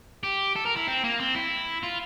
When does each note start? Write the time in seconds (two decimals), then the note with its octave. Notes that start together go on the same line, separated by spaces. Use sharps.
0.24 G4
0.56 A4
0.66 A#4
0.77 E4
0.88 C4
1.04 A#3
1.20 C4
1.35 E4
1.83 F4